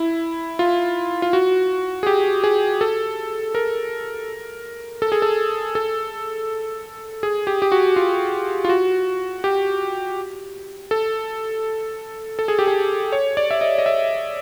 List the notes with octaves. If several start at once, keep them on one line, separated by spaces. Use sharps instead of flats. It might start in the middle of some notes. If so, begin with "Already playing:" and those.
Already playing: E4
F4
F4
F#4
G#4
G4
G#4
A4
A#4
A4
G#4
A4
A4
G#4
G4
G4
F#4
F4
F4
F#4
G4
A4
A4
G#4
G4
G#4
C#5
D5
E5
D#5
D#5
E5